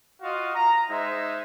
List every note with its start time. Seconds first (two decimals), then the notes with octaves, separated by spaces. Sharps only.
0.21 F4 F#4 D#5 F5
0.55 A#5
0.89 G#3 D#4 C5 E5